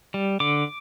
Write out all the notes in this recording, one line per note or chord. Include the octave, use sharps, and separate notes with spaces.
G3
D3 D6